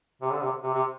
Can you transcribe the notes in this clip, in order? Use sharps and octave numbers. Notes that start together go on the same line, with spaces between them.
C3
D3
C3
C3
C3